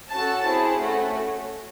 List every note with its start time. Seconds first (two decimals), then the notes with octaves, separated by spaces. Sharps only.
0.11 C#4 F#4 A4 A5
0.45 C4 E4 G#4
0.79 A3 C#4 F#4